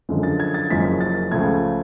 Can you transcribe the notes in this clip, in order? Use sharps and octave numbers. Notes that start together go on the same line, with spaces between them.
F#2 D3 F3 G#3
A6
G#6
A6
F#1 F#2 F3 G#3 B6
A6
C#2 C#3 F3 A3 G#6